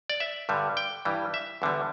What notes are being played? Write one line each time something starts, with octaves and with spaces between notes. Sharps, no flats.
D5
E5
G2 D3 G3
G5
G2 E3 G3
E5
E2 D3 G3